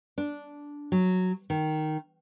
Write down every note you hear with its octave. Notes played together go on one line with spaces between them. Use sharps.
D4
F#3
D#3